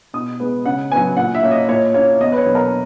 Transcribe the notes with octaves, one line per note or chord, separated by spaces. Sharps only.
B2 D#6
G#3 B3
C#3 F#5
F#3 B3 G#5
A#2 F#5
E5
A#3 C#4
D#5
A#2 C#5
A#3 C#4 C#5
E2 D#5
B4
C#5
B2 F#3
A#4